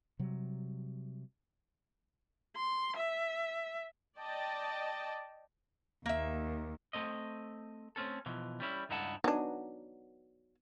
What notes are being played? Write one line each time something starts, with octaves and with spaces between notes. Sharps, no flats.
C3 F#3 G3
C6
E5
D5 D#5 G5 A5
D#2 A#3 E5
A3 C4 D#5
A3 C4 C#4 A4
B2 E3 F3
G3 C#4 E4
C#2 G2 D#4 E4 F#5 A5
F#3 B3 D4 D#4 G#5